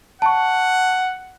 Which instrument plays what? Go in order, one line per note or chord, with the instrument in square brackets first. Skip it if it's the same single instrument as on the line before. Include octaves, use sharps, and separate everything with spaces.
[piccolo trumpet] F#5 [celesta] A5 C#6